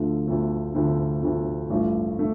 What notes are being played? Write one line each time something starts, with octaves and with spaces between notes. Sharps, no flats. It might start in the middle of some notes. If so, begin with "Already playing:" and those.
Already playing: D2 D3 F3 A3
D2 D3 F3 A3
D2 D3 F3 A3
D2 D3 F3 A3
A1 G2 F3 A3
A3